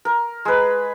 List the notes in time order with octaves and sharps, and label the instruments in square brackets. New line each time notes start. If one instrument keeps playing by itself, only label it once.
[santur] A#4
G#3 B4